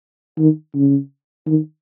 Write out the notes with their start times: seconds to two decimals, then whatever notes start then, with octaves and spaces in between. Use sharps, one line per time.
0.38 D#3
0.75 C#3
1.47 D#3